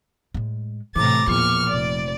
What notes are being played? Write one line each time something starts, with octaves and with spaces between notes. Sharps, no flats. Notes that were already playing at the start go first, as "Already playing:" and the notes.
A2 G#3
A2 C3 E3 A#5 D6 A6
E2 A#2 F3 C#6 F6
F1 D5